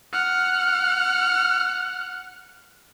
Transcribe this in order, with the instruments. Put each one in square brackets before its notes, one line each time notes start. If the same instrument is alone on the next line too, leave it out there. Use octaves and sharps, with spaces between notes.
[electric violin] F#5 F6